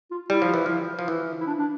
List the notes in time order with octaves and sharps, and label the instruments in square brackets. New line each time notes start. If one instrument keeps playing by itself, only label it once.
[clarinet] F4
[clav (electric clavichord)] G3 [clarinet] E4
[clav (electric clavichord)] F3
E3
F3
F3
E3
[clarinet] E4
D4
D4